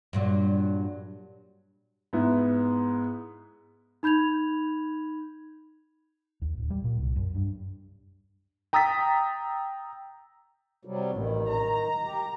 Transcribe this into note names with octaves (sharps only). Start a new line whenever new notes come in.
G2 A#2 F#3
G#2 B3 E4
D#4 B5 G6 G#6 F7
D#2
D1
G3
A#2
C2
F#2
G2
G5 A#5 D#6 E6 A6 B6
C3 F#3 G3
A1 D#3
A#5
G4